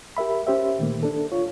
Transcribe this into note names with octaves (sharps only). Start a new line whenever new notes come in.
G4 A#4 E5 B5
C#4 G4 C5 E5
A#2 D#3 A3 A#3
D4 A4
F4 C#5